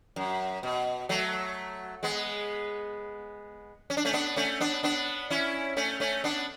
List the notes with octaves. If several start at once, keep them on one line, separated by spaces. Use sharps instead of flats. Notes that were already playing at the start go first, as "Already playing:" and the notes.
F#2
B2
F#3 A3
G#3 B3
C#4
D4
A3 C#4
B3 D4
A3 C#4
B3 D4
B3 D4
C#4 E4
A3 C#4
A3 C#4
B3 D4